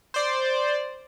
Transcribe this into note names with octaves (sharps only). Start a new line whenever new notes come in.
C5 D5